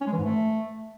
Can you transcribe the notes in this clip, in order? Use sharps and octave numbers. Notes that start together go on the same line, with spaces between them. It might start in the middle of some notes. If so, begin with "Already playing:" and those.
C#4
G#3
E3
G#2
A3